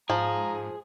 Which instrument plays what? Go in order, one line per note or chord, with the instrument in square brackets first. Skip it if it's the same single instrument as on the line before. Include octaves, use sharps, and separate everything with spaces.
[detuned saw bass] G#2 [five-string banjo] F3 [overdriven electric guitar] G#4 [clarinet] A#5